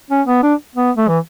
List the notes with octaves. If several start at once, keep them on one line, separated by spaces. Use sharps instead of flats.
C#4
B3
D4
B3
A3
E3